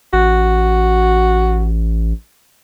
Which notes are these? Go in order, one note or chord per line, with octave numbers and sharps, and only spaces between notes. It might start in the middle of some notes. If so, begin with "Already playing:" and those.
A1 F#4